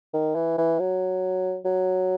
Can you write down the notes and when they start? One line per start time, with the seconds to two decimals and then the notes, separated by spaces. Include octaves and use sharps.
0.14 D#3
0.35 E3
0.58 E3
0.80 F#3
1.65 F#3